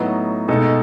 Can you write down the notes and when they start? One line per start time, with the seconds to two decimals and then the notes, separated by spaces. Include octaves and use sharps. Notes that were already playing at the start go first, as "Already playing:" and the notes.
Already playing: A2 F#3 B3 D#4
0.48 B2 G#3 D#4 A4